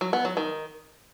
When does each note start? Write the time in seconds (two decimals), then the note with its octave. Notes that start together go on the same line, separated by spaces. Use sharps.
0.01 F#3
0.13 B3
0.25 F#3
0.37 D#3